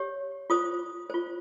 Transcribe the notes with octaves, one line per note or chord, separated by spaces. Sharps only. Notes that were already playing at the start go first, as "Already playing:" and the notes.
Already playing: G4 C#5
F4 C5 D#6
F4 C5